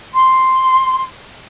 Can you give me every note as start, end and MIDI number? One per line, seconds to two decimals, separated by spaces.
0.13 1.03 84